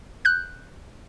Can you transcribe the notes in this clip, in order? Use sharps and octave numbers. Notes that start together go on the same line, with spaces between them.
F#6 G6